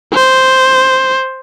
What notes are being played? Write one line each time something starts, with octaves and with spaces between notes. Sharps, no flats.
C5